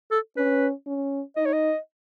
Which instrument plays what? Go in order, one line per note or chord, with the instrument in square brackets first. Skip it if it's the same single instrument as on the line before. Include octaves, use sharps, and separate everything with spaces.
[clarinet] A4
[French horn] C#4 [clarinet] B4
[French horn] C#4
[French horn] D#4 [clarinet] D#5
[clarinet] C#5
D#5